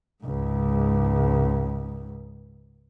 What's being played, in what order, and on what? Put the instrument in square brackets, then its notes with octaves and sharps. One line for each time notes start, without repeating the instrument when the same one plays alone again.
[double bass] C#2 G#2